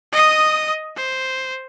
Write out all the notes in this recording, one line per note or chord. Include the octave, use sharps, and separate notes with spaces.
D#5 D#6
C5